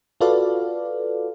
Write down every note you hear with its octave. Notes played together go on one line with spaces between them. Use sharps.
F4 F#4 A4 B4 D5 F5